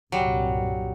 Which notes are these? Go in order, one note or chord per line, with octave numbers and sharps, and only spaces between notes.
C2 G2 A#2 F#3 G3